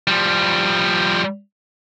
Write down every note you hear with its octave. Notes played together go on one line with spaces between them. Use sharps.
F3 G3